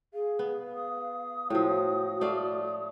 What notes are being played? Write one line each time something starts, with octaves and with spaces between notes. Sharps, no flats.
G#4 F5
B3
D#6
A2 F3 F#4
A3 D5 F5